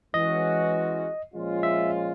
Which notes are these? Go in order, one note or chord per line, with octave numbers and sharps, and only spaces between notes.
E3 G#3 C#4 F#4 D#5
A#2 F3 G#3 C#4 F4
E5